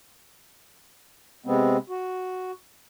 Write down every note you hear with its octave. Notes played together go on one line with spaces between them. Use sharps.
C3 G#3 B3 C4
F#4